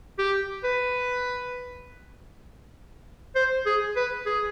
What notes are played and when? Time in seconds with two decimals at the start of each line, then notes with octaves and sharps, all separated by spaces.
0.19 G4
0.64 B4
3.36 C5
3.66 G#4
3.96 B4
4.26 G#4